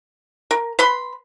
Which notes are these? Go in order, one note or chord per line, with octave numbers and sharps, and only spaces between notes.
A#4
B4 B5 C6